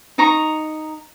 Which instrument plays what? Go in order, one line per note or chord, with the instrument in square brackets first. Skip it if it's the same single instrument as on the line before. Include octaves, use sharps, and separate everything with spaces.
[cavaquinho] D#4 A#5 C#6